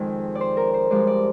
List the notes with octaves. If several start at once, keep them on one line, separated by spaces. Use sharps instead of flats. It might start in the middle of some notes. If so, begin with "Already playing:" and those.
Already playing: F2 D#3 G#3 G#4
D5
C5
A#4
C5
G2 F3 G#3 D5
D5